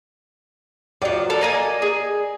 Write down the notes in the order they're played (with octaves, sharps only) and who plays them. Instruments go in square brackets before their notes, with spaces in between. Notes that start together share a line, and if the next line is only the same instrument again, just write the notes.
[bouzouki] F3 F#3 [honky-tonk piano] D5
[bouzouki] A4 A#4
A#3 D#5 G#5
G#4